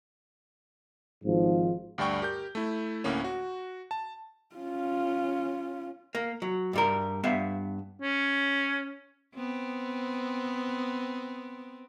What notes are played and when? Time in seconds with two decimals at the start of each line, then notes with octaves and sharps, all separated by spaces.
1.23 G#1 G#2 F3
1.98 D2 G2 D5 G5 C#6
2.22 G4 A#4 G6
2.55 A3 E4
3.04 D2 A2 A#3 C#4
3.24 F#4
3.91 A5
4.55 C#4 F4
6.15 A#3
6.42 F#3
6.73 G2 G3 A#4
7.24 G2 B3 E5 F5
8.02 C#4
9.35 B3 C4